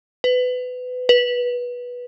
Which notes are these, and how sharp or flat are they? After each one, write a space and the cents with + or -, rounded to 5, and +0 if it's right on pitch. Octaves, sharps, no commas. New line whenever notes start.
B4 +25
B4 -15